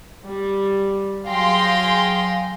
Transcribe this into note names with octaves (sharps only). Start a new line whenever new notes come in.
G3
F#3 G#4 F5 G5 C6 A#6